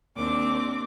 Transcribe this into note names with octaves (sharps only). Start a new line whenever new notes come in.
D#2 C4 D4 D6